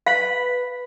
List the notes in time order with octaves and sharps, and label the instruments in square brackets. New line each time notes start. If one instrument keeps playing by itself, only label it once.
[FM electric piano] B4 B5 [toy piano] F5